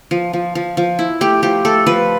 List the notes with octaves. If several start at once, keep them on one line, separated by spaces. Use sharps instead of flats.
F3
F3
F3
F3
E4
A3 G4
F3 G4
A3 A4
F3 B4